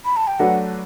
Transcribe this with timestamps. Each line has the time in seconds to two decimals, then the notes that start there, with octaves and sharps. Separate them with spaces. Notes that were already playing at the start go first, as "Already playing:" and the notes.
0.05 B5
0.17 A5
0.27 G5
0.39 F#3 A3 D4 F#4 B4 F#5